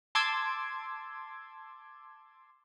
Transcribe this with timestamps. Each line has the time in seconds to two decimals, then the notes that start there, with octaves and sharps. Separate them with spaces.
0.15 A5 C6 D6 E6 G#6